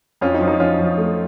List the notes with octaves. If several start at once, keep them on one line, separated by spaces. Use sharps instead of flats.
F2 C#4 F4
D#4
F3
D#4
F2 C#4 F4
F3
A3